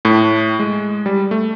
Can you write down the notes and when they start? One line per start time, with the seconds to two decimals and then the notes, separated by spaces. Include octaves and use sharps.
0.05 A2
0.59 G#3
1.06 G3
1.31 A3